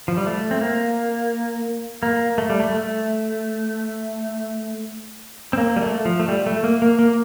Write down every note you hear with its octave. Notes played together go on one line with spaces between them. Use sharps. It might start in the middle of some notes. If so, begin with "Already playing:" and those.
F3
G3
A3
C4
A#3
A#3
A3
G3
A3
A3
C4
A#3
G3
A3
F3
A3
G3
A3
A#3
A#3
A#3